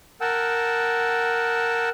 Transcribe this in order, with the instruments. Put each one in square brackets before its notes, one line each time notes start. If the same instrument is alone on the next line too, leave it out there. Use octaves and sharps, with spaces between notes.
[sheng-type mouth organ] A#4 F#5 G5 A5 E6